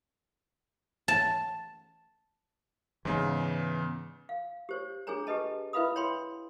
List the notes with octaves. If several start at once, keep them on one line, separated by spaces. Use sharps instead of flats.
A5
G#2 C#3 E3 B3
F5
G4 C5 C#5
D4 G#4 A4 C#5 G#5 A#5
G4 A4 B4 D#5 A5
E4 B4 E5 F5 B5 D#6
C#5 G5 B5 C6